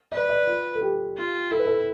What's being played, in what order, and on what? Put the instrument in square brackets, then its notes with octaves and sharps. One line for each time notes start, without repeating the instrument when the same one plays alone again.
[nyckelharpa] B4 [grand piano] D5
[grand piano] D5
F4
A4
G4
[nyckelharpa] F4
[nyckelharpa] E4 [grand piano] A4
[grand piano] B4
A4